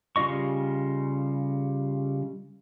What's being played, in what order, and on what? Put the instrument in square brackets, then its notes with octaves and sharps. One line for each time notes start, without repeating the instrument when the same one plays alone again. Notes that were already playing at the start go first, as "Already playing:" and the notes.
[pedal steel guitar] C#3 G3 F4 D#5 C#6